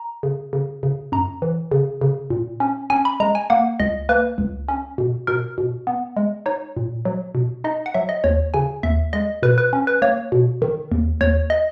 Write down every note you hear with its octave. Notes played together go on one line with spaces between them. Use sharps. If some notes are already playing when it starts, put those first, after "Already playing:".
Already playing: A#5
C#3
C#3
C#3
F#2 A#5
E3
C#3
C#3
A#2
C#4
C#4 G#5
B5
G#3 A#5
G#5
A#3 F#5
C#2 D#5
A#3 B4
C#2
C#4
B2
B2 A#4
B2
B3
G#3
D#4 C#5
A#2
F#3
B2
D#4 D#5
F#5
F#3 E5
D#5
D#2 C#5
C#3 G#5
D#2 E5
G#3 D#5
B2 B4
B4
C#4
B4
A#3 C#5
B2
D#3
D#2
D#2 C#5
D#5